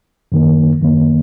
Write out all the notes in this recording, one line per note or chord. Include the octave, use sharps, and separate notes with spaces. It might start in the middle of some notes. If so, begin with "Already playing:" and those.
F#2 D#3 A#3
F#2 D#3 A#3